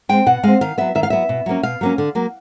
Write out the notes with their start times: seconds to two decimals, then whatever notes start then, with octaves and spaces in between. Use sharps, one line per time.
0.09 G#3 C4 G5
0.26 B2 F#5
0.43 G#3 C4 F5
0.61 D#3 F5
0.78 F#3 B3 E5
0.95 D#3 E5
1.03 F5
1.10 F#3 B3 E5
1.29 B2
1.46 F#3 A#3 C#4
1.63 B2 F5
1.81 F#3 A#3 C#4
1.98 D3
2.15 F#3 A#3